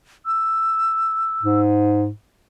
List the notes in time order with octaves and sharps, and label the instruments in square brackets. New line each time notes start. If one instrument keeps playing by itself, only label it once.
[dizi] E6
[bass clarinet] G#2